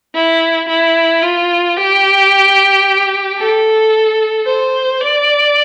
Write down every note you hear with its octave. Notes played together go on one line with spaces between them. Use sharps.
E4
E4
F4
G4
A4
C5
D5